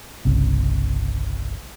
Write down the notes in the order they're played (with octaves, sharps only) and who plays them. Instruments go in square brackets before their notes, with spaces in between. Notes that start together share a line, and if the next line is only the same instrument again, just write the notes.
[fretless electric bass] G1 C2 C#3